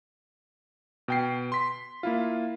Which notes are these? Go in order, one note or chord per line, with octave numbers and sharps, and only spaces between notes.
B2 G5 C7
C6 B6
A#3 E4 F4